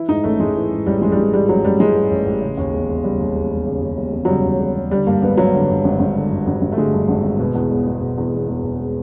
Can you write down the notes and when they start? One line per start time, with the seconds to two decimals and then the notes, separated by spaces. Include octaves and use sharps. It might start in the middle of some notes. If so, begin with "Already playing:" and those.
Already playing: E3 E4
0.09 G#2 D#4
0.24 A1 A3
0.40 A1 G#3
0.56 E3
0.70 G#2
0.86 A1 G3
1.01 A1 G#3
1.12 G3
1.17 E3 G#3
1.33 G#2 G3
1.49 A1 F#3
1.64 A1 G3
1.79 E3 G#3
1.95 G#2
2.11 A1
2.26 A1
2.41 C#3
2.57 D#2
2.73 E1
2.88 E1
3.04 C#3 G3
3.19 D#2
3.36 E1
3.51 E1
3.66 C#3
3.82 D#2
3.97 E1
4.12 E1
4.25 F#3
4.28 C#3 G3
4.45 D#2
4.59 E1
4.76 E1
4.91 D3 G3
5.07 G2 A#3
5.22 G#1 B3
5.37 G#1 F#3
5.54 D3
5.68 G2
5.84 G#1
5.99 G#1
6.15 D3
6.30 G2
6.47 G#1
6.61 G#1
6.72 A3
6.77 D3 G#3
6.93 G2
7.08 G#1
7.24 G#1
7.40 B2
7.55 E2
7.70 E1
7.87 E1
8.01 B2
8.18 E2
8.33 E1
8.48 E1
8.63 B2